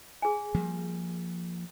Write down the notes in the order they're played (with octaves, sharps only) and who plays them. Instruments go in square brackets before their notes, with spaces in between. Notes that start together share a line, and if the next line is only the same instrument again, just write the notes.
[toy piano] G#4 G#5
[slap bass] F3 G3 A#3